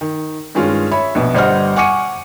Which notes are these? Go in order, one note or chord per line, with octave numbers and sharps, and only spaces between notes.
D#3
G2 D#3 G#3 C#4 F4
C#5 E5 B5
A#1 B2
G1 G3 C5 D#5 F#5 F6
F#5 G#5 C#6 D6 C#7 D#7